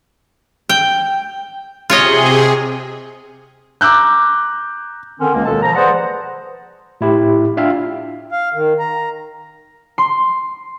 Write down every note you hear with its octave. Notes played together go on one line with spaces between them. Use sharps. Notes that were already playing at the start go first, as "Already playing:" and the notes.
G5
C3 F4 G#4 C#5 D#5
A#5 D6 E6 F#6 G6
D3 D#3 C4 C#4
C#2 A#3
D#2 B2 D#3 G#3 A4 A5
F3 A#5
G#4 B4 C5 D5 F#5
A2 E4 G4
D4 F4 E5 F5 G5
F5
D#3
A#5
C6